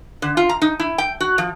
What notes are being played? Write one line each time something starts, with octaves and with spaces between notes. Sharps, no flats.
D3
F4
A#5
D#4
E4
G5
F#4
F3